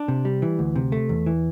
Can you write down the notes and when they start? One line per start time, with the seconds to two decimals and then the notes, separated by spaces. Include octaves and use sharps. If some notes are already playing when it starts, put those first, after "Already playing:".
Already playing: D4
0.08 C3
0.25 G3
0.42 E3
0.59 D2
0.76 C3
0.92 A3
1.09 E2
1.26 E3